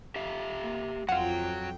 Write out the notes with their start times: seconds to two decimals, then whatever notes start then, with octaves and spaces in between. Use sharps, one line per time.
0.16 G4 E5 F5
0.62 A#3
1.09 F2 F#3 F4 F#5 G5